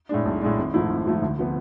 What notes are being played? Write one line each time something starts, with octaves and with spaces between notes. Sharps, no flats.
A2 G#3 D4
B1
A2 G#3 D4
G#1
G#2 F3 A3 E4
G#1
G#2 F3 A3 E4
D2
C3 F3 B3